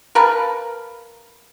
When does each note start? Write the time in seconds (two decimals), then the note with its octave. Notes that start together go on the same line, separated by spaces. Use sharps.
0.15 A#4 B4 F5 A5